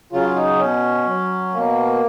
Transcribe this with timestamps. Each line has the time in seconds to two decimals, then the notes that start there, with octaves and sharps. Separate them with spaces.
0.12 C#3 F#3 F4
0.36 D#4
0.59 B2 C#4
1.06 F#3
1.53 B2 A#3